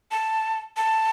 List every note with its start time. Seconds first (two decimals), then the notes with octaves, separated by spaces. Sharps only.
0.11 A5
0.77 A5